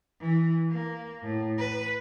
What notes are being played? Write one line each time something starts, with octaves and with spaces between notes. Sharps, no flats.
E3
A#3
A2
B4